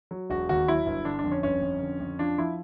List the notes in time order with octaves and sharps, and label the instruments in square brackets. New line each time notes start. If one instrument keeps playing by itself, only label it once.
[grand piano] F#3
E1 F#4
D#2 F#4
F#3 E4
G1
D3 D4
D4
F2
C#4
G1 C#4
F2
D3
F2
F3 D4
F3 E4